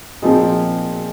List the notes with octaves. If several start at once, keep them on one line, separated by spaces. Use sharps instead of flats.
A#2 F3 C4 D#4 G#4